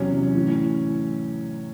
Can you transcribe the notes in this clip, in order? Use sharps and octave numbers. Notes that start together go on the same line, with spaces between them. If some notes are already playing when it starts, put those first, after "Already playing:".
Already playing: E2 C3 F#3 C#4
A2 E3